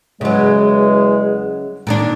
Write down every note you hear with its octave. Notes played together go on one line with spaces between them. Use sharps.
E2 C#3 F#3 G#3
A#2 D#3 D4